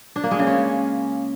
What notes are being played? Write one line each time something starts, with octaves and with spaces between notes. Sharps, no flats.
D4
A#3
G#3
C#3
C#4